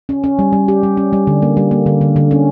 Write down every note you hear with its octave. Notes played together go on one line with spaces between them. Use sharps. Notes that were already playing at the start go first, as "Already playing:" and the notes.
C#4
C#4
G3
G3
G4
G3
C#4
G3
D3
A#3
G3
A#3
D3
D3
D3
C#4